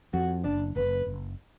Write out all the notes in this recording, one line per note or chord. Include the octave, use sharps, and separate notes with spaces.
F2 F#4
F#1 D4
F#1 B4
F#1